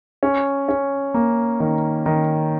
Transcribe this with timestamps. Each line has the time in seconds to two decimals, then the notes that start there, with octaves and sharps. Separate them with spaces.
0.23 C#4
0.69 C#4
1.14 A#3
1.60 D#3
2.06 D#3